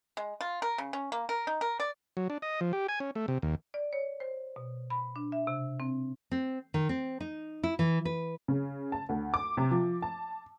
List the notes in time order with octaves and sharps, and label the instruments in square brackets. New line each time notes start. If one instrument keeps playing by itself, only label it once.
[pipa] G#3
F4
A#4
C#3
C#4
A#3
A#4
D#4
A#4
D5
[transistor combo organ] F#3
D4
D#5
F3
G4
G#5
C#4
A3
C3
D#2
[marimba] D5
C#5
C5
B2
B5
D4
E5
C3
C4
[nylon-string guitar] C4
D#3
C4
D#4
E4
E3
B4
[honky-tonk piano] C#3
A5
D2
D6
C3
F3
A5